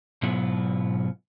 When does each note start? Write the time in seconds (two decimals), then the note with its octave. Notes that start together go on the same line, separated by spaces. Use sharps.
0.23 G#2 B2 F#3 B3 E4 F4